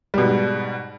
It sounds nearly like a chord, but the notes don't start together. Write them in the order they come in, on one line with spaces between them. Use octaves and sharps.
G3 B2 G#2